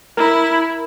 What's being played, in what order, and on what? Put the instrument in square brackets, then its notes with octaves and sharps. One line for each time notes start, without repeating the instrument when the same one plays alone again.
[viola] E4 [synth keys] A#4